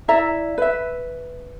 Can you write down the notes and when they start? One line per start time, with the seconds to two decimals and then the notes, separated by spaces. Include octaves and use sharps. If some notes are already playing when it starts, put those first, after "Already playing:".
0.08 E4 D5 E5 A#5
0.58 B4 E5